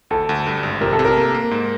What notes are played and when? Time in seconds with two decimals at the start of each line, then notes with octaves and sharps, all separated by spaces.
0.10 D2 A4
0.29 D2
0.47 G2
0.63 G#1
0.81 C3 A#4
0.93 A4
0.99 C3
1.05 A#4
1.17 A#3
1.35 A#3
1.51 G#2